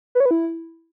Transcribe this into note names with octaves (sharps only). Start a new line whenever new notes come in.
B4
C#5
B4
E4